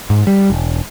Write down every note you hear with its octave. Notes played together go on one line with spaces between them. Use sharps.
G#2
G3
E1